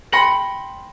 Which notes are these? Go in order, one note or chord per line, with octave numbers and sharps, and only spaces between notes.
G5 B5 C6 A#6 C#7 F#7